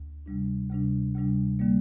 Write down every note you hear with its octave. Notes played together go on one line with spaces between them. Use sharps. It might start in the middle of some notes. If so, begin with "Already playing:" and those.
Already playing: D2
D2 C3 G3 D4
D2 C3 G3 D4
D2 C3 G3 D4
D3 G3 A#3